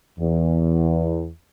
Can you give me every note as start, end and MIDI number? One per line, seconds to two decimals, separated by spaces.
0.19 1.28 40